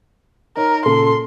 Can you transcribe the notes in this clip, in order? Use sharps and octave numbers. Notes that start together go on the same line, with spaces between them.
D#4 A#4 C#5
A#2 C#3 A4 C6